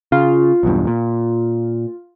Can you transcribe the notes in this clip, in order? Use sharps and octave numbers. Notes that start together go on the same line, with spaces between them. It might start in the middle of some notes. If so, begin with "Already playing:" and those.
C#3 F4
B1 E2 G2
A#2